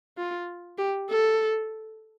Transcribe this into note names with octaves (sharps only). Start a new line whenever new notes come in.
F4
G4
A4